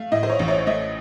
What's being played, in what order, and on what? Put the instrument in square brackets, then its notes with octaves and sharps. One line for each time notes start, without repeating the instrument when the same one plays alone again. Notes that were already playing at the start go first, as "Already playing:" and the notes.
Already playing: [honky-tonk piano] A3 F5
A2 D#5
C5
C#5
A1
C#5
A3 D#5